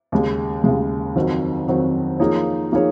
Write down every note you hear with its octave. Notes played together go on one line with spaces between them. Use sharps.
D#2 C#3 G#3
D#2 C#3 G#3
F2 D#3 F#3 C4 F#4
F2 D#3 F#3 C4 F#4
F3 A#3 D#4 G#4 C#5
F3 A#3 D#4 G#4 C#5